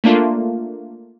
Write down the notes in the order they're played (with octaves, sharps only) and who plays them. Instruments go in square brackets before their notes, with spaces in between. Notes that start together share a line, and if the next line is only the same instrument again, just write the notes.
[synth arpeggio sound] A3 A#3 D4 F4